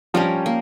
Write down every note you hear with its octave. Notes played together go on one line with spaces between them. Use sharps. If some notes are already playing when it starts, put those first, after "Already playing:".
F3 G3 C#4 G4 A#4
A#3